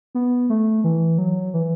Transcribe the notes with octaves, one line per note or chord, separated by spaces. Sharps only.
B3
A3
E3
F#3
E3